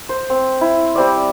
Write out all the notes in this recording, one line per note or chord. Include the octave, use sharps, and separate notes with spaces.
C5
C4
E4
G3 C4 D5